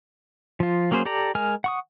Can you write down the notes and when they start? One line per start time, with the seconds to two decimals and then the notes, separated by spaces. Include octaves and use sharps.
0.60 F3 F4
0.91 F#3 A#3 C#4 G#4 C5
1.05 G4 A4 D5 A#5
1.35 G#3 A#4 G#5 F6
1.64 F#5 C#6 D#6